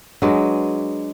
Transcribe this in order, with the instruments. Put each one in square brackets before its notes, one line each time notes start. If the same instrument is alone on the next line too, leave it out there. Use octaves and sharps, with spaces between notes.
[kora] F#3 G#3 [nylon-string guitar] D4 G#4 B4